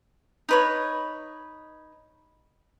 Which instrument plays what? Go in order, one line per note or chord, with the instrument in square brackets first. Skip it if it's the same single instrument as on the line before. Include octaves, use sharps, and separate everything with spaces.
[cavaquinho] D#4 B4 C#5